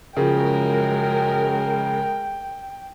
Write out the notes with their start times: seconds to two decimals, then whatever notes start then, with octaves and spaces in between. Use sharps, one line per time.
0.17 F#2 C#3 F3 G#3 A#4 G5